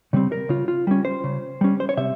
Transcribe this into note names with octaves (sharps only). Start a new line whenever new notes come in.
C#3 G3 C4
A#4
C#3 F4
F4
G3 C#4
C5
C#3
G3 C#4
C5
C#5
C3 E5